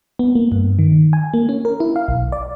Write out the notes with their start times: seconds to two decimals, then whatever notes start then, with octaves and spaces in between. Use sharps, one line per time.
0.19 B3
0.35 A#3
0.52 G2
0.79 D#3
1.13 G#5
1.34 A#3
1.49 C#4
1.65 A#4
1.80 E4
1.96 F5
2.08 B1
2.32 D5